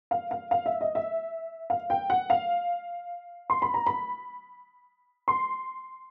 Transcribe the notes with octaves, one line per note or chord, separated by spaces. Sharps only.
F5
F5
F5
E5
D#5
E5
F5
G5
F#5
F5
C6
B5
A#5
B5
C6